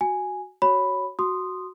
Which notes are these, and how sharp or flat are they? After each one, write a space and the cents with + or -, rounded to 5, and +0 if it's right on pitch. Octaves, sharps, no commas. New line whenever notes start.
F#4 +0 G#5 +0
F#4 +15 C#5 +0 B5 +0
F#4 +0 C6 +0 D#6 -15